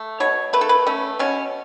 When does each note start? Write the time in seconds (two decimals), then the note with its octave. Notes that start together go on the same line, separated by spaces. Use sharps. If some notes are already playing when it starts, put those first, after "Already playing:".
Already playing: A3
0.20 B2 C#5
0.53 A3 B4
0.61 A4
0.69 B4
0.87 A3 C#4
1.19 B2 C#4